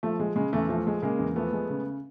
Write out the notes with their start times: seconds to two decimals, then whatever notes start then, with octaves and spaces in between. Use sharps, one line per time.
0.03 F3 A3
0.20 G#3
0.36 C#3 G#3
0.53 E2 A3
0.69 F3 A3
0.87 G#3
1.02 C#3 G#3 A#3
1.19 E2
1.36 F3 A3 B3
1.53 G#3
1.70 C#3